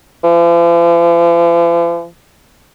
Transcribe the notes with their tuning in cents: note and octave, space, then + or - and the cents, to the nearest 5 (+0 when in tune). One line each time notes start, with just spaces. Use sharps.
F3 -45